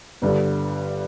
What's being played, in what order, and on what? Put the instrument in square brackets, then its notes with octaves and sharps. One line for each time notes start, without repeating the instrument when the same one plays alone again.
[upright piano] G1 G2 D3